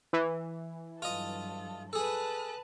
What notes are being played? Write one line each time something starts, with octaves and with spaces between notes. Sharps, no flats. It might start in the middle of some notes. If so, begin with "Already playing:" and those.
E3
G2 F#3 F4 A4 D#5
G#4 A4 B4 A5 F#6